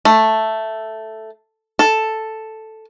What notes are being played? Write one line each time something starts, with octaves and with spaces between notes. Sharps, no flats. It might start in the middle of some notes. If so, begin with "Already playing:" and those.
A3
A4